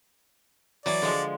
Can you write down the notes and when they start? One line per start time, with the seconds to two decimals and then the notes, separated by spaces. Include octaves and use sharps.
0.86 E3 F#3 D5
1.02 D3 F3 G#3